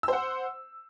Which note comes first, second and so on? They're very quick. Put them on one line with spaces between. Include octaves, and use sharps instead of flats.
E6 C5 F#5